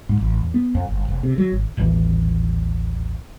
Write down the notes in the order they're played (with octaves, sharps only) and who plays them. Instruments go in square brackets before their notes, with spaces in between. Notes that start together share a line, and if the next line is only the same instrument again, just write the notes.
[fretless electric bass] G#2
A1
E2
B3
F2
G1
F1
C3
F#3
G#1
[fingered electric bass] D#1 A1 E3